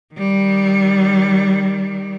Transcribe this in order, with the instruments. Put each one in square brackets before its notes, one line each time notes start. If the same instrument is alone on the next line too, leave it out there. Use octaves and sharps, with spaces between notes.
[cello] D#3 G3